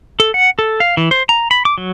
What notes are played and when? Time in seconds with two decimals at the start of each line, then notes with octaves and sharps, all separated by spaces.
0.20 A4
0.34 F#5
0.59 A4
0.80 F5
0.97 E3
1.11 C5
1.29 A#5
1.51 B5
1.65 D6
1.78 F#3